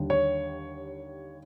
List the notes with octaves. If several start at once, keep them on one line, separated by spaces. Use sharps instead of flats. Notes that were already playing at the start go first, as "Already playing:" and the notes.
Already playing: D#2 D3 G3
C#5